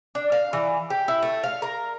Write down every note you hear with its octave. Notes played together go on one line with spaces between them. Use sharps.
D4
F5
E3
G4
E4
A3
F5
A#4